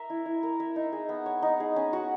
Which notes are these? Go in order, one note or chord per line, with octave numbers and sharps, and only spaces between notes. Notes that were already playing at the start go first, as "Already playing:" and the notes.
Already playing: A#4 E5
E4
E4
A#4
E5
D#4
G#4
B3
C#5
D#4
G#4
C#4
F#4